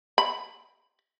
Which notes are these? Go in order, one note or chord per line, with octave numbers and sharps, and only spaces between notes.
B5